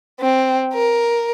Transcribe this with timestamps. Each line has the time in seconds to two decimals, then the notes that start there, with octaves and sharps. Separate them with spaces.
0.20 C4
0.74 A#4